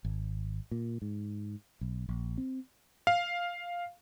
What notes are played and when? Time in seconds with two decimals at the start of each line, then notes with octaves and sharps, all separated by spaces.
0.05 G#1
0.71 A#2
1.02 G#2
1.81 B1
2.09 A#1
2.38 C4
3.07 F5